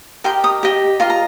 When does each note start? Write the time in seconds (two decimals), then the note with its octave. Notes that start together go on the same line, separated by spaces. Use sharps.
0.24 G4 A#4 D#5 G5 C6
0.44 A#5 D#6
0.63 G4 D#5
1.00 F4 A#4 D#5 C6
1.10 A#5